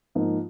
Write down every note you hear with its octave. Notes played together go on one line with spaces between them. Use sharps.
G#2 F3 A#3 D#4